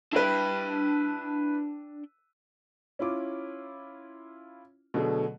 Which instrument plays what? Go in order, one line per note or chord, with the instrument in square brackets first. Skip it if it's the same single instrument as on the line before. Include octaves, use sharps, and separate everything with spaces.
[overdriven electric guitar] D4 G5 [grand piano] E4 B4
[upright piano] C#4 E4 F4 D6
B2 D3 F#3 A3 G#4